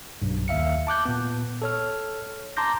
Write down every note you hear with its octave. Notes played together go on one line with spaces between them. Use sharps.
B1 G2
D#2 E5 F5 C#7
A5 D6 F#6 G6
A#2 B3
A4 C#5 F6
A5 A#5 C6 D6 G6 A#6